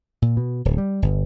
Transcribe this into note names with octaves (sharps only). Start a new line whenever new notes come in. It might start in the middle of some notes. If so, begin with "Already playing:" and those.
A#2
B2
D1
G3
G1